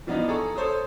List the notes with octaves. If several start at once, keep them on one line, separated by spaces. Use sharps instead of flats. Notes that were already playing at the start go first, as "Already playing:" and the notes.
E3 F3 B3 D4 D#4 F4
G#4 A4 A#5 C#6
A4 C5 C#5 D#6